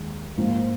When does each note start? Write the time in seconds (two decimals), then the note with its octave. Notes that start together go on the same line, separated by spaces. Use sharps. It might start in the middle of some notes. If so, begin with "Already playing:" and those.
Already playing: D#2 D#3 G#3
0.37 G#2 F3 A#3